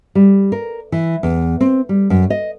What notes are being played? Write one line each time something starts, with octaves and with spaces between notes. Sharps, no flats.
G3
A#4
E3
E2
C4
G3
F#2
D#5